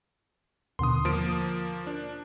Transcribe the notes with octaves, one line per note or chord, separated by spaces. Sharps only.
D#2 B2 D3 C6 D#6
F3 A#3 D7
D4